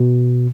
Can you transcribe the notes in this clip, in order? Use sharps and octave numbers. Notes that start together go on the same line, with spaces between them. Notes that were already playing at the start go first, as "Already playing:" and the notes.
Already playing: B2